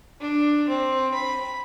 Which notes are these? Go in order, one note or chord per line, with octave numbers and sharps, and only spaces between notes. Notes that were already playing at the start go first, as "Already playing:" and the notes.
D4
C4
B5